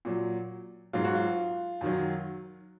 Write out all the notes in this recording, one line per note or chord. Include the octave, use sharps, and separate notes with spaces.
A#2 F#3
G#2 F#3 F4
F#4
F4
F#2 D#3 F#3